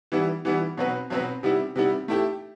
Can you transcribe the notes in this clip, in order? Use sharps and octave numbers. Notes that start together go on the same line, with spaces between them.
E3 G3 B3 E4
E3 G3 B3 E4
B2 F#3 C4 F#4 B4
B2 F#3 C4 F#4 B4
C3 G3 B3 E4
C3 G3 B3 E4
A3 E4 G4